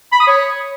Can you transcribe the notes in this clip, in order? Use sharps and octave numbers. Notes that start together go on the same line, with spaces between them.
B5
D#6
C#5